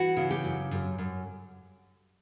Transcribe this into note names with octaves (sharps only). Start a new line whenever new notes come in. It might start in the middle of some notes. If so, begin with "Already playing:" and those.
Already playing: E3 F#4
C#3
G4
F#2
F#2
F#2